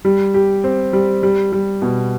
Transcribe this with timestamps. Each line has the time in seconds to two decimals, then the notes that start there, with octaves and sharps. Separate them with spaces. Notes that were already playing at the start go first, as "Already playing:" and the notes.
0.05 G3
0.34 G4
0.64 C4
0.93 G3
1.23 G3
1.52 G3
1.82 B2